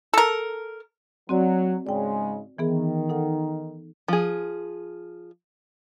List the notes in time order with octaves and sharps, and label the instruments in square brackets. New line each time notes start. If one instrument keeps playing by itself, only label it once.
[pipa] A4 A#4
[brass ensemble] F#3 [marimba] C4 F#4 D5
[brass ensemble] G#2 C#3 G#3 [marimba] D5 G5
[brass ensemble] D#3 [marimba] E3 B3 G#4
[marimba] D#4 A4 F#5
[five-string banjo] F3 G#4